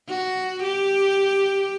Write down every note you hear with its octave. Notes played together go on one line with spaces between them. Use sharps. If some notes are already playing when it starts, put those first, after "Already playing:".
F#4
G4